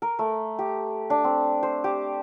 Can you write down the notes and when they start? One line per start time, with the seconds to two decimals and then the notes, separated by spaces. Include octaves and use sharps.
0.02 A#4
0.19 A3
0.59 G4
1.10 D4
1.24 C4
1.63 C5
1.84 G4